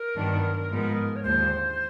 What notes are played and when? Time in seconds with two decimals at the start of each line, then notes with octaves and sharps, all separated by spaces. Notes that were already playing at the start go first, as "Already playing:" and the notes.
Already playing: A#4
0.15 G2 D#3 F#3 B3 D4
0.70 G#2 F3 G#3 B3 D#4
1.16 C#5
1.23 D#2 D3 F3 G#3 C5